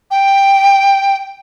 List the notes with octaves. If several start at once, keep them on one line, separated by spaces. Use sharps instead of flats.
G5